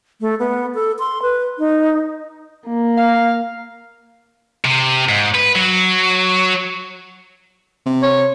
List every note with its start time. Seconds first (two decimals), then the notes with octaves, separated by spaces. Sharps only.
0.21 A3
0.40 B3
0.75 A4
0.99 C6
1.22 B4
1.58 D#4
2.67 A#3
2.97 F5
4.65 C3
5.09 G#2
5.35 B4
5.55 F#3
7.86 C3
8.03 C#5